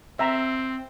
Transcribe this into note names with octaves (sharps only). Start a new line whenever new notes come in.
C4 E5 A#5